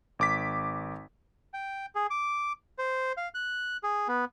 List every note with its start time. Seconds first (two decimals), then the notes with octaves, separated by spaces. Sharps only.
0.19 G#1 D6 B6
1.54 G5
1.95 G#4
2.11 D6
2.78 C5
3.17 F5
3.34 F#6
3.83 G#4
4.08 B3